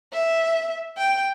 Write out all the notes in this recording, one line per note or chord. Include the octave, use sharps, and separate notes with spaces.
E5
G5